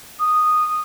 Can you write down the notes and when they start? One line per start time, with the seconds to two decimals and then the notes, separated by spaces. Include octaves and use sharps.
0.20 D#6